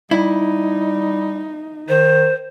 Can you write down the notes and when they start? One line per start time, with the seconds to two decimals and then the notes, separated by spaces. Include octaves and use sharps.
0.11 G3 D#4 E4
1.89 D#3 C5